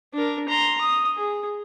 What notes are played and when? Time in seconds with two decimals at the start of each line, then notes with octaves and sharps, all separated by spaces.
0.14 D4 A#4
0.49 A#5 C6
0.81 D#6
1.16 G#4